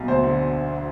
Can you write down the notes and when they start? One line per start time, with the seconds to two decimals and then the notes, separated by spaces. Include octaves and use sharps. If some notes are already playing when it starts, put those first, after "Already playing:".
Already playing: B1
0.08 D2 C5
0.23 D3